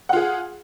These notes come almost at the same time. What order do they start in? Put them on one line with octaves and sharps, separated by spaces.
F#5 F4 G#4